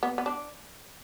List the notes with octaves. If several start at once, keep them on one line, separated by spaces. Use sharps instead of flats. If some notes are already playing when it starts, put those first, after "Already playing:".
B3
B3
D4